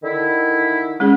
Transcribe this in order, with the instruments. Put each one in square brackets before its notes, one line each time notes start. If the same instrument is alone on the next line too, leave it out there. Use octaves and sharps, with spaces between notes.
[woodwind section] D3 D#3 E4
[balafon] G#3 C#4 G#4